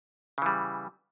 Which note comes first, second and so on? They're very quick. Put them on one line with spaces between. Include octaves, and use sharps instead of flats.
C#3 E3 G3